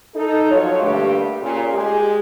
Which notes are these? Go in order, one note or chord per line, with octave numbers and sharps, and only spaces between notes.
D#4 A4
F3 F#3 F4 C#5
G2 D3 G3 A3 A#3 G4
A#2 C#3
G#3 G4 G#4